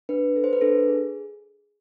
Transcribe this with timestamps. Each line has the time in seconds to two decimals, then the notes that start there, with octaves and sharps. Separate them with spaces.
0.09 D4 B4
0.36 A4
0.44 C5
0.53 B4
0.61 D4 A4
0.88 G#4